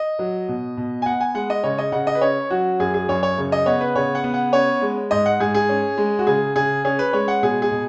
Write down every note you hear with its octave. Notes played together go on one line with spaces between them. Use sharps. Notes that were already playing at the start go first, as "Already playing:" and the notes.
Already playing: D#5
F#3
B2
B2
G#5
B3 F#5
G#5
G#3 F#5
D#5
C#3 C#5
D#5
C#3 F#5
D#5
B4
C#4 C#5
F#3 F#4
F#2 G#4
G#4
F#2 C#5
C#5
C#3
D#5
B3 C#5
B4
C#3 C#5
F#5
B3
F#5
C#4 C#5
G#3
G#2 D#5
F#5
G#2 G#4
G#4
C#4
G#3
F#4
C#3 G#4
C#3 G#4
C#4 G#4
B4
G#3 C#5
F#5
B2 G#4
G#4
B2